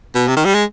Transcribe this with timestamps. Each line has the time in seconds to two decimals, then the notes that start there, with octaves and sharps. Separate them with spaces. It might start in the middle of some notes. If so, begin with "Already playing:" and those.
0.15 B2
0.28 C3
0.37 D#3
0.45 G3
0.55 G#3